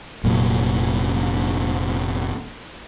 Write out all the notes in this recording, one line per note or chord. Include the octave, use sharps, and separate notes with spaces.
F1 A#2 F#3